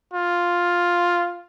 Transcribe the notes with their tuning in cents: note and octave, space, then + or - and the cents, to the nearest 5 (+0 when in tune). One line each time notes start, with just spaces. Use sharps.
F4 +5